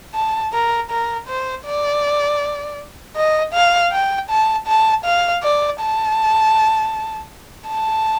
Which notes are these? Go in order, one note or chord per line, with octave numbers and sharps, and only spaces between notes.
A5
A#4
A#4
C5
D5
D#5
F5
G5
A5
A5
F5
D5
A5
A5